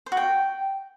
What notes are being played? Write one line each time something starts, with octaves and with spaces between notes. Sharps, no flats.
C5
F#4
G5